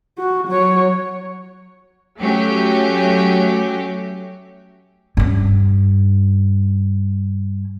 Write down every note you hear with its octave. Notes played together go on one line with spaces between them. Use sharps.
F#4
F#3 C#5
F#3 A3 C#4 G4
G2 C#4